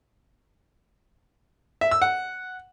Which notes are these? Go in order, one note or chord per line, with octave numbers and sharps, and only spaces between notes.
E5
E6
F#5